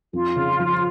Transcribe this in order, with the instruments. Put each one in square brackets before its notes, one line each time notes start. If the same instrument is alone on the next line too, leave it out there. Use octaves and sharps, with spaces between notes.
[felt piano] F2 [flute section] F4
[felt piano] C#3
F3